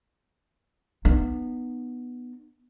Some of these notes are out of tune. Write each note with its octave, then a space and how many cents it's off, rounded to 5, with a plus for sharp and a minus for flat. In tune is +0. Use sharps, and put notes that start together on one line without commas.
B3 +0 D#4 -30